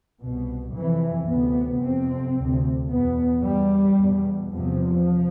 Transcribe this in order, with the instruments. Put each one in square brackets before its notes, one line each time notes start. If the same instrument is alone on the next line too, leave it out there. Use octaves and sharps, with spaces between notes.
[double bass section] C2 B2
F2 C3 E3
D2 C3 B3
F2 C3 C4
D2 C3
E2 B2 B3
E2 B2 G3
E2 B2
E2 C3 F3